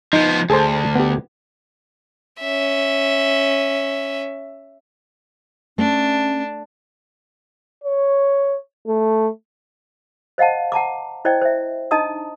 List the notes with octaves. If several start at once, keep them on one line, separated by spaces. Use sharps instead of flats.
F3 B3 D#4
D2 G#4 A4 C5
B3 G4
C#4 E5
A3 C#4 D4
C#5
A3
C5 D#5 F5 F#5 A5
F#5 A5 A#5 D6
E4 C5 D5 D#5 G5
C5 E5
D4 D#4 D#5 A5 A#5 D#6